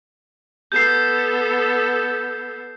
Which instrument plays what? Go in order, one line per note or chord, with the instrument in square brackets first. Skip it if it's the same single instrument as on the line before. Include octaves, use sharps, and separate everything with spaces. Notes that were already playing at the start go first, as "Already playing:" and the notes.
[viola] B3 A4 [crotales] G6 C7